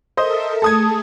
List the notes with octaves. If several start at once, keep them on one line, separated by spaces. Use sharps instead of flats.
A4 A#4 C5 D#5 E5
A3 G#4 A4 D#6 G#6